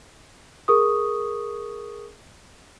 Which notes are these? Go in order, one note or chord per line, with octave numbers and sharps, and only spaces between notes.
G#4 A#4 C#6 D#6